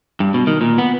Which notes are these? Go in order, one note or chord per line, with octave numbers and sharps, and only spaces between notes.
G2
B2
D#3
A#2
B3